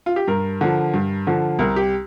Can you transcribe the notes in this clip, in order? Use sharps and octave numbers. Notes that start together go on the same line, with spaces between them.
F4
G4
G2 A#4
D3 F3
G2
D3 F3
C2 A#4
G4